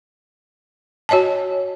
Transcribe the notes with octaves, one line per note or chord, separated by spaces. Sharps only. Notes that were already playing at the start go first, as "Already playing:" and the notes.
F#4 C#5 D#5 G#5 A5